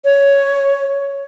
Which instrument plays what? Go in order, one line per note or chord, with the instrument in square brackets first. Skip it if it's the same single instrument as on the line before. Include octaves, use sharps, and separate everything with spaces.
[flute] C#5